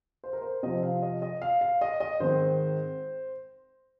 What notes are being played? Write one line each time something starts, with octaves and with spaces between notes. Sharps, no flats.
C5
A#4
C5
C3 F3 C4 D#5
F5
D#5
D#5
F5
F5
D#5
D#5
G#2 D#3 C4 C5